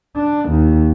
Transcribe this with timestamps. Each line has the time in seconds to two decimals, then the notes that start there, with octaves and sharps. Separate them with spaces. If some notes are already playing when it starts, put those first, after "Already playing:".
0.16 D4
0.49 D#2